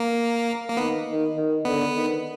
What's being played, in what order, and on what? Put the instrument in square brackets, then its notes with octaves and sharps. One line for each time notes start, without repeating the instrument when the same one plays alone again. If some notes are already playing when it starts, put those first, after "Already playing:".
Already playing: [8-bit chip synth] A#3
A#3
[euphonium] D#3 [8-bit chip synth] B3
[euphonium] D#3
D#3
[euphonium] D3 [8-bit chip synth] B3
[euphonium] D#3